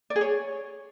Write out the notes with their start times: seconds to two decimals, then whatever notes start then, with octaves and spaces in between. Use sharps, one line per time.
0.10 D5
0.16 G#4
0.21 C#5